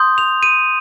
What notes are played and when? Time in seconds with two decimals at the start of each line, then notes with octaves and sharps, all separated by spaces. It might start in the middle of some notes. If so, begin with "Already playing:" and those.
Already playing: C6 D#6 G6
0.18 F7
0.43 D#7